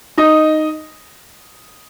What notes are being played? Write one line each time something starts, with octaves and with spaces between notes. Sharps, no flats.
D#4 D#5